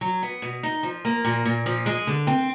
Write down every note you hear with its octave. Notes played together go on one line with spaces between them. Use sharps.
F#3
B3
B2
D#4
F3
A#3
A#2
A#2
F3
G#3
D3
C4